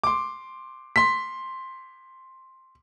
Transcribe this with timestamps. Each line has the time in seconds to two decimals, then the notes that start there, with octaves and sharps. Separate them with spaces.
0.04 C6 D6
0.96 C6 B6